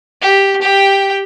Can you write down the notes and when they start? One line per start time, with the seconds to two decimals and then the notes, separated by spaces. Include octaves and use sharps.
0.21 G4
0.62 G4 G5